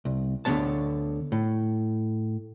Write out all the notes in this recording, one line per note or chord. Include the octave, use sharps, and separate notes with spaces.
C2
D2 D3 F3 B3 C#5 A5
A2